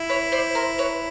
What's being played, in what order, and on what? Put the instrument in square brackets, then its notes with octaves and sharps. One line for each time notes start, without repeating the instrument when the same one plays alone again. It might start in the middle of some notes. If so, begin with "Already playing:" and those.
Already playing: [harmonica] E4
[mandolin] B4 C#5
C5 D5
A#4 C5
B4 C#5